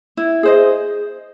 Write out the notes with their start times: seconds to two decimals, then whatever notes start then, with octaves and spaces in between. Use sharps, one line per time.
0.17 E4
0.43 G#4 C5 D#5